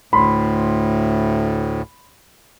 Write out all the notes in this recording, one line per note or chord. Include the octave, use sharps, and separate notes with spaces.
D2 A2 B5 C6